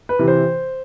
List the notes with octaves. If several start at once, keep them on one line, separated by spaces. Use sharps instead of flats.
B4
C3 E3
C5